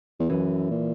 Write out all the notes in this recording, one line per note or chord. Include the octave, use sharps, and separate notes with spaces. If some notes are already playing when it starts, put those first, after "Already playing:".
E2
F#2 E3
A#2